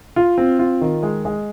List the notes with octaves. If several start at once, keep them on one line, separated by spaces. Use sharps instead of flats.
F4
C4
F4
D#3
G#3
G#3